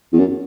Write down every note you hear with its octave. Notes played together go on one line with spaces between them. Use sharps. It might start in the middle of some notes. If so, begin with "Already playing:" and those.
E2
F#2